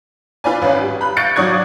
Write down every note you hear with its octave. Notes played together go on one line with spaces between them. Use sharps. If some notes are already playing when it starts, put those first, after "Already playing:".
F4 B4 D5 G#5
G#1 C#4 B4
G3
B5 F#6
C#6 F#6 G6 A6 C#7 D7
G#1 F#3 D5 C#6 D#6 G#6